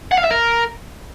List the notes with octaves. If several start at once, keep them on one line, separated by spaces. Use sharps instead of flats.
F#5
F5
E5
A#4